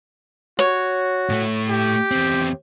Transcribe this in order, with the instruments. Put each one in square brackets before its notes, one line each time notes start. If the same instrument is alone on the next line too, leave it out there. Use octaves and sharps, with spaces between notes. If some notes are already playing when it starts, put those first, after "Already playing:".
[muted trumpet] F#4 [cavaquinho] C#5
[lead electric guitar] A2 A3
[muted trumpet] G4
[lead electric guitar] E2 C4